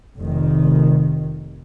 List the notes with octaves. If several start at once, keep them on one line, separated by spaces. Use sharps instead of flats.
F1 D#3